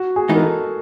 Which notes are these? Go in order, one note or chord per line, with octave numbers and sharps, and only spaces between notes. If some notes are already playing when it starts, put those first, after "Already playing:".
Already playing: F#4
G#4
E3 G#3 B3 D#4
A#4
A4